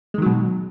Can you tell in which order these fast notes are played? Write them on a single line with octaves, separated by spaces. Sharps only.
G#3 D#3 F#3 B2